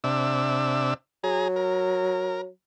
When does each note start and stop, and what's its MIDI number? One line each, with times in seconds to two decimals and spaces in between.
0.04 0.94 48
0.04 0.94 62
0.04 0.94 76
1.24 2.48 54
1.24 1.48 68
1.24 1.48 82
1.56 2.41 70